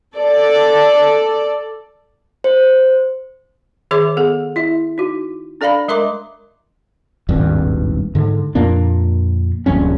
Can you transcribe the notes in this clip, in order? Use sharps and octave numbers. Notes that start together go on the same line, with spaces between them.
A4 D5
C5
D#3 G#4 C#5 E5 D6
B3 G#4 A4
E4 E5
D#4 F#4
D4 A4 D5 F5 A#5 B5
G#3 A#4 E5 A#5 C6 D6
D#1 G#1 G2
G#2 D3
F2 A#2 A#3 D4
D1 A#1 G2 C#4